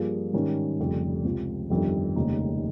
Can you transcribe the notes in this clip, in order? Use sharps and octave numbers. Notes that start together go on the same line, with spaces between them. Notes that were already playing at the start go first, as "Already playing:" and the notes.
Already playing: G2 F3 A#3 F4 G#4
G#2 D#3 G3 C#4
F1 F2 C#3 G3
C#2 C3 F3
G1 F2 D#3 G3
F1 D#2 C#3 G#3 D#4